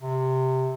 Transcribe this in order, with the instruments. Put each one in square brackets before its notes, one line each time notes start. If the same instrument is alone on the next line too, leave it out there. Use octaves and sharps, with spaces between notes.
[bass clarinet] C3